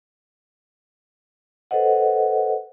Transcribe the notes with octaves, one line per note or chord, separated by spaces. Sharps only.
A4 B4 C5 D#5 F#5